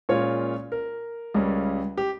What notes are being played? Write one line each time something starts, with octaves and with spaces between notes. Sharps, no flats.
A#2 G#3 C#4 F4 C#5
A#4
C#2 C#3 G3 C#4
G4